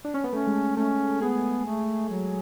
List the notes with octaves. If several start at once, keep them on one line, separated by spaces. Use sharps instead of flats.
D4
C#4
B3
A3 C#4
G#3
A3
A3 C#4
B3 G#4
A3
F#3